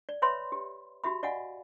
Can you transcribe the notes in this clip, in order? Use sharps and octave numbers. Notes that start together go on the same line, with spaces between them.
D5
B4 C#5 E5 B5 C6
G4
F#4 G4 E5 B5
D5 D#5 F5 F#5 G#5